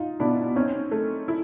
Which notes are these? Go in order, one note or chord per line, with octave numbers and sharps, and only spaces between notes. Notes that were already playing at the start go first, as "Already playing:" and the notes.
Already playing: D#4 F4
B2 D4 E4
C4 C#4 D#4
A3
E4